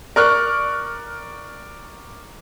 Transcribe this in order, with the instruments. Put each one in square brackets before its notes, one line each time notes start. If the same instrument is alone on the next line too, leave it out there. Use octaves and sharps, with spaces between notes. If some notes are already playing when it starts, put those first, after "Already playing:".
[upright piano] A#4 D5 C#6 F6 F#6